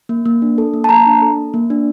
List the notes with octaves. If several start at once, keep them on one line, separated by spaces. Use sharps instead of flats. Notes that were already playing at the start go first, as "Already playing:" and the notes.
A#3
A#3
D4
A4
A#3
A5
A#3 A#5
D4
A4
A#3
A#3
D4